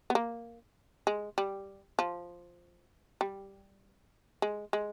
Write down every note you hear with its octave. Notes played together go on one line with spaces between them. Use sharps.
B3
A#3
G#3
G3
F3
G3
G#3
G#3